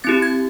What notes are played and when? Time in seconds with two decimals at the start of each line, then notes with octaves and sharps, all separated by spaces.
0.04 C4 E4 G4 A6
0.22 G#6